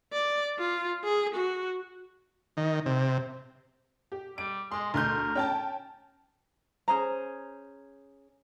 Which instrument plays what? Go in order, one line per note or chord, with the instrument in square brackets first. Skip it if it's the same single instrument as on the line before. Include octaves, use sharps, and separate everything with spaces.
[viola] D5
F4
G#4
F#4
[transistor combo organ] D#3
C3
[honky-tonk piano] G4
[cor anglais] G3 [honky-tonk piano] D7
[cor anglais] G#3 [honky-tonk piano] C6
[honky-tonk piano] D2 C6 G6 [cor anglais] A#4
[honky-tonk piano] C#4 G5 A5
[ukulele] C#4 G#4 C5 A#5